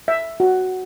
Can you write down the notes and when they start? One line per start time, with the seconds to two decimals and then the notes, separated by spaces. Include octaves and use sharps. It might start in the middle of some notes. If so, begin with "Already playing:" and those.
0.08 E5
0.40 F#4